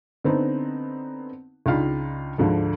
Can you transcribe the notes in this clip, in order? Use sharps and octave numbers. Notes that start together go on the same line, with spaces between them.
D3 B3 C4 D#4
C#2 D4 D#4 F4 F5 B5
D2 G#2 D3 F3